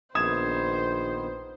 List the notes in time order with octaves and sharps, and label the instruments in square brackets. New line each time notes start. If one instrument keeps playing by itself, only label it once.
[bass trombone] A#1 [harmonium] D#3 B3 [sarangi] C5 [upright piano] D#6 G#6 E7